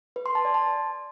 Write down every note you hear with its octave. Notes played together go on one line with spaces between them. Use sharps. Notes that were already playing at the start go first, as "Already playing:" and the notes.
B4
C6
A5
D5
A5